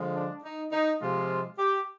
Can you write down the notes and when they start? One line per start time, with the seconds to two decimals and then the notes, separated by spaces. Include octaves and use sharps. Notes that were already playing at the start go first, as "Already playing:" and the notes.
Already playing: D3 F3 G#3
0.14 D4
0.44 D#4
0.71 D#4
1.00 C3 F3 G#3 F4
1.58 G4